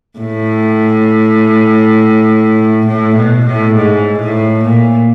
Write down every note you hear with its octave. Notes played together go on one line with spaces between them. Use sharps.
A2
A2
B2
A2
G#2
A2
A#2